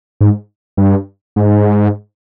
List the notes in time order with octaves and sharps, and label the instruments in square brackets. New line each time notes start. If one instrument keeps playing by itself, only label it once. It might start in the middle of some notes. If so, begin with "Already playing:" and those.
[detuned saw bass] G#2
G2
G#2